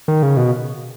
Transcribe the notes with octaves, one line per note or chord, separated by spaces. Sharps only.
D#3
C#3
B2